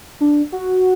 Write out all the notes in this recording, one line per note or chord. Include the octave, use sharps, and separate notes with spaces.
D4
F#4